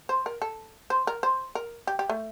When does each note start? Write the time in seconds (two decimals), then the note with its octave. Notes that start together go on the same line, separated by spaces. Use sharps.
0.09 C5
0.26 A#4
0.42 A4
0.90 C5
1.07 A#4
1.23 C5
1.55 A#4
1.87 G4
1.99 G4
2.10 A3